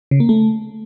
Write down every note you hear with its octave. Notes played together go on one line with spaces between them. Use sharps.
C#3
A#3
A3